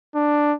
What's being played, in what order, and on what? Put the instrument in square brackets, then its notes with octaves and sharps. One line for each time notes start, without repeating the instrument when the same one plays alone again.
[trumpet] D4